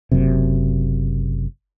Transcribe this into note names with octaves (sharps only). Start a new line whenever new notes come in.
F#1 F#2 C3